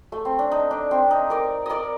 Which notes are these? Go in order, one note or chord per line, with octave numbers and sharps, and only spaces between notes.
A3
C4
D4
D#4
D4
C4
D#4
A#4 D5
A#4 D5 D#5